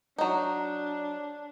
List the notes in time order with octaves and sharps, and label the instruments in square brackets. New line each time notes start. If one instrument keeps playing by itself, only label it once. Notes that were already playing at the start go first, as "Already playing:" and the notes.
[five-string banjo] F#3 D#4 [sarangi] D4